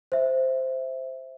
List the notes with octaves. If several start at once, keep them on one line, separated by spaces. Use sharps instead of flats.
C5 E5